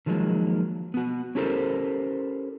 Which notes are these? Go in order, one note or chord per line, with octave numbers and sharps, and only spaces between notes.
D#3 F3 F#3 G#3 A#3
B3 F#4
C#4 E4 G4 A4 A#4 C5